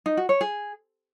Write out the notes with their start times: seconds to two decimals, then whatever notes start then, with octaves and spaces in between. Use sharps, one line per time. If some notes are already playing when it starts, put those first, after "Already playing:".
0.06 D#4
0.17 F#4
0.29 C#5
0.41 G#4